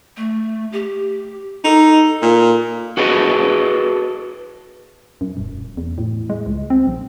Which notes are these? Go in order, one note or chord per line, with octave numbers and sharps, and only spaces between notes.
A3
G4
D#4 A4
A#2
F#4 G#4 A4 B4 D#5
F#2
D#1
E2
A2
G#3
C#2
C4
A#1